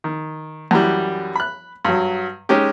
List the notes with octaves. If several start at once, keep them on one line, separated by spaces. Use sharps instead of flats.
D#3
F#2 E3 G3
B5 F#6
G2 F#3
G#3 C#4 D#4 G4